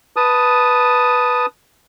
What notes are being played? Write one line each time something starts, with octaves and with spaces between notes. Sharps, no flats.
B4 A5 D#6